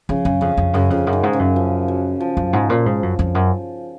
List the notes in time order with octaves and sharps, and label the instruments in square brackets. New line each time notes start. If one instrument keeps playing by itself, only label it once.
[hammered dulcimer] C#3 [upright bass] F3
[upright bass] F#2 [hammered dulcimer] C#3
[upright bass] F2 [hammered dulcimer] C#3
[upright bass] F2
[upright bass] F#2 [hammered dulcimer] C#3
[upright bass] F2 [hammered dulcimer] C#3
[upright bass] F#2
[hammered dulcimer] D#3
[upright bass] G#2
[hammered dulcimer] C#3
[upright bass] F#2
[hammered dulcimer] F3
F#3
F3
[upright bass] F#2
G#2
A#2
G#2
F#2
F2
F#2